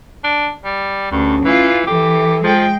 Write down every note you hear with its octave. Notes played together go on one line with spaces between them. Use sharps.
D4
G3
D2 G2 C#4
E3 F4
E3 G4 A4
F3 G#3 G5